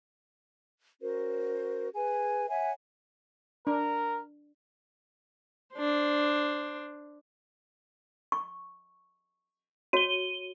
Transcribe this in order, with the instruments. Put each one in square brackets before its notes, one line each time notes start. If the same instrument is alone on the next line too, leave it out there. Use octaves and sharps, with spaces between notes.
[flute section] C#4 F#4 A#4 C5
G#4 B4 G#5
C#5 E5 F#5 G#5
[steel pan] D4 [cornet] A#4
[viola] D4 C5
[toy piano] C#6
[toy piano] F#4 C#5 [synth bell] D#7 G7